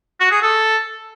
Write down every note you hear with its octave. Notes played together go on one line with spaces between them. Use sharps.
F#4
G#4
A4